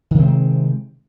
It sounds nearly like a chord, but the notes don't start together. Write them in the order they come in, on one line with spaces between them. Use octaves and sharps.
D#3 C3 C4 G#3